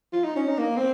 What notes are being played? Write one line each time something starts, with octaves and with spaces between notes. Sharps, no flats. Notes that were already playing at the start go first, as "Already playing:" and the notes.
F4
D#4
C#4
D#4
A#3
C4